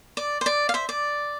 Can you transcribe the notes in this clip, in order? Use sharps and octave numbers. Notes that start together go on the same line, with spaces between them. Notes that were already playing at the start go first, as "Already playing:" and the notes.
D5
C5
D5
F5
C5 E5
D5